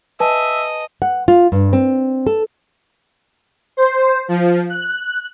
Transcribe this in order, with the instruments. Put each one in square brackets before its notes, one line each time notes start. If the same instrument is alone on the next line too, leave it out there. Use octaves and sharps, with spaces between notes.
[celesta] B4 G#5 A5 [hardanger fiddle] D#5 [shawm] E5
[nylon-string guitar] F#5
F4
G2
C4
A4
[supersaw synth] C5
F3
F#6